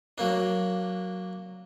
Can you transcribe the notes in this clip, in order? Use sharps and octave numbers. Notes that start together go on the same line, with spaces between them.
F#3 A#3 D4